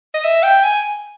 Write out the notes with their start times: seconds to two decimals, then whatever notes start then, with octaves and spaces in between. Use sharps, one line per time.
0.14 D#5
0.24 E5
0.43 G5
0.64 G#5